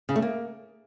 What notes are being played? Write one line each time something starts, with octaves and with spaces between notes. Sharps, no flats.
C#3
A3
A#3